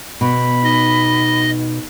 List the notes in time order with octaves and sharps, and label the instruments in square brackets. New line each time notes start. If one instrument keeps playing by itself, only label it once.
[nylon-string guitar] B2 [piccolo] B5
[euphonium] D#4 [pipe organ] D#5